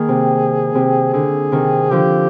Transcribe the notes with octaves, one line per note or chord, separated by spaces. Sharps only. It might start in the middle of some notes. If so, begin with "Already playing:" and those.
Already playing: D#3 A#3 G#4
C3
C3
D3 G#4
C3 D#3
D3 F3 G4